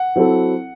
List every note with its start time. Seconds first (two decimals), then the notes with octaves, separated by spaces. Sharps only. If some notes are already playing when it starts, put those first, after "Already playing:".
Already playing: F#5
0.16 F#3 C4 E4 A4